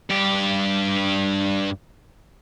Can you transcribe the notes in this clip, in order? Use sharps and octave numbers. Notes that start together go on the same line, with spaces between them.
G2 G4